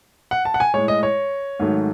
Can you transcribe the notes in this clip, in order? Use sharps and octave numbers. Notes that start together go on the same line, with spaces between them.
F#5
A5
F#5
G#5
A2 G#3 C#5
D#5
C#5
G#2 D#3 F#3 A3